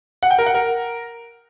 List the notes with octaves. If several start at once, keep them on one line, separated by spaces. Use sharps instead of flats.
F#5
G5
A#4
F#5
A#4